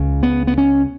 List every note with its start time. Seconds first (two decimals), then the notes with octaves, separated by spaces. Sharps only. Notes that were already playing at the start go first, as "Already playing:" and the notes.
Already playing: C#2 C#3
0.23 B3
0.47 B3
0.58 C#4